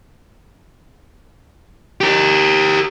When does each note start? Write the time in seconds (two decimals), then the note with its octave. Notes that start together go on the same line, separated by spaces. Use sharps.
2.01 G4 A#4